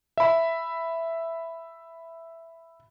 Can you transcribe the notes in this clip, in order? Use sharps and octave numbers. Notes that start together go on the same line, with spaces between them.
E5 B5